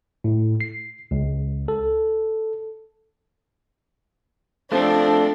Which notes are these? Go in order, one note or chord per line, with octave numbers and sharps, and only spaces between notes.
A2
C7
C#2
A4
F3 A3 C4 D4 A4